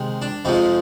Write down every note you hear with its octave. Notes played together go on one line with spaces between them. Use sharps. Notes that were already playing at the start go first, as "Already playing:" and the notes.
Already playing: C3 D#3 G#3
D4
F2 C3 F3 G#3 D#4